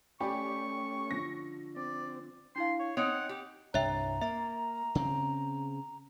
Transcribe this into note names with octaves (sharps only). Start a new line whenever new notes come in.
A3 C#4 G4 D5 G#5 B5 C#6
D3 F3 A#6
C4 D5
D4 E4 F5 C6
C#5
C4 D#4 C#5 F#5 F7
G4
C2 G2 C#5 E5 G5 A#5
A#3 E5
C#3 C4